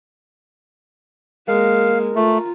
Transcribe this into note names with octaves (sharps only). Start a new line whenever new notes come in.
G#3 A#3 A#4 F5
A3 F4